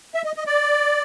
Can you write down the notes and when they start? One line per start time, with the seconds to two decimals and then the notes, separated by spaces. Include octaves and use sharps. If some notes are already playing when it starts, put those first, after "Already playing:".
0.14 E5
0.25 D#5
0.36 D#5
0.46 D5